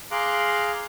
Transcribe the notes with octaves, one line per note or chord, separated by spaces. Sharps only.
G#4 F5 A#5 C6 D6 F#6